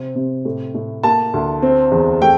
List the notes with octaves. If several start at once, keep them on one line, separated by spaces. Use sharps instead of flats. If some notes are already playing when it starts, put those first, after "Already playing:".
Already playing: C3 C4
C3
A2
A2
A#3 A5
D2
C4
E2
A3 G5